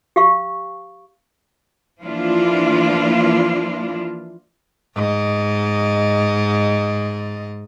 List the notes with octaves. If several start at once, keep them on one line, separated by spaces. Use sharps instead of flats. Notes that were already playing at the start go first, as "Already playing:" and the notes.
G4 F5 C#6
E3 F3 A#3 D4 E4 F4
G#2 D#5